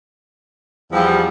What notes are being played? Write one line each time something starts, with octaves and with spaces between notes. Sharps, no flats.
E2 F3 G3